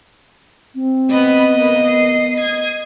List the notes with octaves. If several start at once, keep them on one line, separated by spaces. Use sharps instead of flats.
C4
B3 D#5 B5
A#3 B3 B4
C7
D#6 G#6